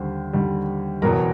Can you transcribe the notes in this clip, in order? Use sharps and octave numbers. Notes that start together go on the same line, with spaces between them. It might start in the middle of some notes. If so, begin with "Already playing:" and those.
Already playing: D#2 D3 G3 C5
D#2 D3 G3
F#1 E2 B2 F#3 A#4 A#5